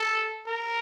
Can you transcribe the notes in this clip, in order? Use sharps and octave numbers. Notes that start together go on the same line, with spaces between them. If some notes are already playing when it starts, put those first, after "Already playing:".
Already playing: A4
A#4